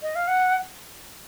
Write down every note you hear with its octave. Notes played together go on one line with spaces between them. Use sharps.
D#5
F5
F#5